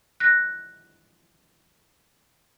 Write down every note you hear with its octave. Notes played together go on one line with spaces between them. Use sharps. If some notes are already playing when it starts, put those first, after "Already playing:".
F#6 A#6